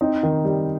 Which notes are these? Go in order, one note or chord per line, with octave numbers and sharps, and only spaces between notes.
C4 D#4
D#3
G3